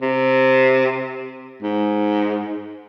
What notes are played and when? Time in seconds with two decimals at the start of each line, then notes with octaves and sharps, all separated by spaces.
0.01 C3
1.62 G#2